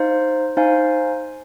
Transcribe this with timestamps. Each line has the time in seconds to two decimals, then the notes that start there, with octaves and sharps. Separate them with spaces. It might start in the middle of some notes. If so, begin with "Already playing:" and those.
Already playing: D#4 C5 F5
0.57 D#4 C5 F5 G#5